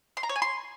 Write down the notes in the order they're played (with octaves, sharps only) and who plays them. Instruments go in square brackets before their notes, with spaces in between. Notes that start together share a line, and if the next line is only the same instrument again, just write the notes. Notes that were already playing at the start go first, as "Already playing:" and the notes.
[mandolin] C6
A#5
C#5
G#5
C6